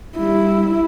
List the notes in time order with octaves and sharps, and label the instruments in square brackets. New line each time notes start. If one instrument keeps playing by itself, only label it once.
[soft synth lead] G3 [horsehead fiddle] E4